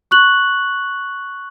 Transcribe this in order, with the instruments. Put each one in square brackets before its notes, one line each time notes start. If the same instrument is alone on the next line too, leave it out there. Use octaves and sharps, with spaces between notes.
[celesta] C#6 F#6 F#7